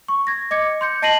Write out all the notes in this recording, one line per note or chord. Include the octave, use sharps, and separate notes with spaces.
C#6
G#6 A#6
D#5 D6 G#6 C#7
C6 G6 C#7
D#5 A5 A#6 C7 D#7 F#7